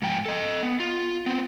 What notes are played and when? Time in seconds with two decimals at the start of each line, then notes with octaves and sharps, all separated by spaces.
0.02 G#2 F3 G5 G#5
0.26 A4 D#5
0.63 B3
0.80 F4
1.26 B3 C4